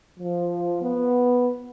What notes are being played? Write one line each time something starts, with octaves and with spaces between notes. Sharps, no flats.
F3
B3